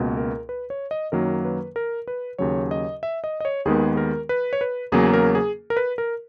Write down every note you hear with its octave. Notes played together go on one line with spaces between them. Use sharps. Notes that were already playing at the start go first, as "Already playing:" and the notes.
Already playing: C#2 B2 A#3
A#4
B4
C#5
D#5
F#2 D#3 F#3 A#3 A#4
B4
A#4
B4
D#2 C#3 F#3 C#5
D#5
E5
D#5
D#5
C#5
D#2 D#3 G#3 B3 G#4
A#4
B4
C#5
B4
E2 C#3 F#3 A#3 G#4
A#4
G#4
A#4
B4
A#4